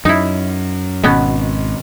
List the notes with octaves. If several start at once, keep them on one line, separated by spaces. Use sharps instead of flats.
F#2 D#4 E4
G#1 B2 B3 C#4